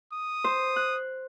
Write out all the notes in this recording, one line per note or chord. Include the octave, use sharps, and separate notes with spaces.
D#6
C5
F#6